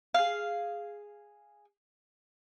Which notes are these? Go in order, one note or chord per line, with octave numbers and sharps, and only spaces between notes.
G#4 F5